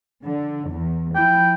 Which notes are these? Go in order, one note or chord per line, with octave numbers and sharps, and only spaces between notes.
D3
E2
F3 E4 G5